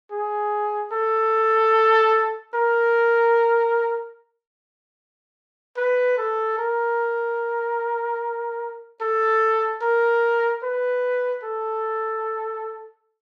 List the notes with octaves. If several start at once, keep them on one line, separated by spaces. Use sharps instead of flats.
G#4
A4
A#4
B4
A4
A#4
A4
A#4
B4
A4